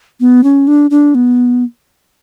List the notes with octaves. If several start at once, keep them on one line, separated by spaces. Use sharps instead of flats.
B3
C#4
D4
D4
B3